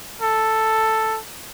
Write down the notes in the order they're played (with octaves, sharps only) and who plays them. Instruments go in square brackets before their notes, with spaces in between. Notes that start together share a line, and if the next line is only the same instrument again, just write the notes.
[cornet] A4